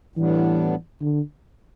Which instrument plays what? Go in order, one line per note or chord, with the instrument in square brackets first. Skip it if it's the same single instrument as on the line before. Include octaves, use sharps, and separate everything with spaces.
[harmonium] A2 G3 B3 D4 [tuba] E3
[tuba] D3